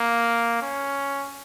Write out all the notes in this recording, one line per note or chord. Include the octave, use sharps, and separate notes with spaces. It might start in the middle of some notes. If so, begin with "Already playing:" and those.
Already playing: A#3
C#4